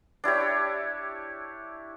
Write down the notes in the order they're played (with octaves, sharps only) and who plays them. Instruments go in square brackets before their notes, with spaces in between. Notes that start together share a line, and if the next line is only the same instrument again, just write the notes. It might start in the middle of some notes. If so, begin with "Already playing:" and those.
[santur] D4 E4 G4 C#5